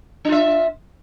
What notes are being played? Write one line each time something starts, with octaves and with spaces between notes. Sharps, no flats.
D4 F4 E5